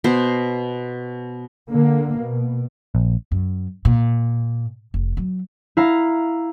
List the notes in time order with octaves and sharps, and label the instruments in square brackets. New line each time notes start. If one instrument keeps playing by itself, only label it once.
[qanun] B2 B3 C5
[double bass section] D3 A#3
B2
[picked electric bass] A#1
[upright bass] F#2
A#2
F1
F#3
[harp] E4 F5 A#5